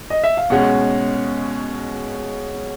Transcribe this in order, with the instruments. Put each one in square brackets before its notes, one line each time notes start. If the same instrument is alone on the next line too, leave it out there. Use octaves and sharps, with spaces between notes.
[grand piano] D#5
E5
F5
[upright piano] B2 G#3 C#4 [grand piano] F#5